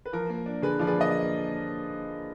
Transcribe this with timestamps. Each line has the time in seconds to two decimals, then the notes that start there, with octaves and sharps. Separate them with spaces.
0.05 B4
0.13 F3 A#4
0.30 A#3
0.46 D4
0.62 D3 G#4 B4
0.79 F3 D5
0.87 G#4 B4
0.96 A#3 D#5